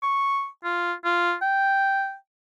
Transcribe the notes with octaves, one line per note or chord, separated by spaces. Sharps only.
C#6
F4
F4
G5